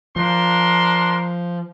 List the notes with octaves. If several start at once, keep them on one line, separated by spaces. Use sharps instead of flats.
F3 D4 A#4 C6